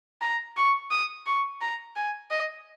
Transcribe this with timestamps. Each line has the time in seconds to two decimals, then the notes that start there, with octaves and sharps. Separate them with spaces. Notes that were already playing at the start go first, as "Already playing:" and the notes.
0.21 A#5
0.57 C#6
0.91 D#6
1.26 C#6
1.61 A#5
1.96 G#5
2.30 D#5